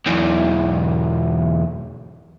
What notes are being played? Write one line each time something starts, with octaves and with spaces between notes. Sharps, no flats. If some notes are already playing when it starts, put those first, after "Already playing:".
B1 E2